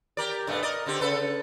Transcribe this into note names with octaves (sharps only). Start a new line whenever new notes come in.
G4 A#4 D5
G2 B2 A3
A#4 D5 D#5
D3 C4 G4
C#3 A4 B4